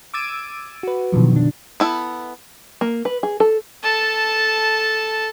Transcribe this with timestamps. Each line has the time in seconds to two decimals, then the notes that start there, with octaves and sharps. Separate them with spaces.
0.14 D6 E6 G#6 A6 D7 D#7
0.83 F#4 B4
1.12 B2 D3 D#3 F3 F#3
1.32 F#2 D4
1.80 B3 E4 A4
2.81 A#3
3.05 B4
3.23 G#4
3.40 A4
3.83 A4 A5